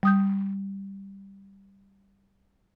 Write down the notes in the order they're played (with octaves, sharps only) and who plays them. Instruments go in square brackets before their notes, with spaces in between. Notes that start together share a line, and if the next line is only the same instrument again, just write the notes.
[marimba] G3 D#6 G6